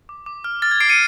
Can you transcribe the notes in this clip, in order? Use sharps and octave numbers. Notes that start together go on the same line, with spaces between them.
D6
D6
F6
F6 A6
G#6
D6 C7 D7
C#7 D#7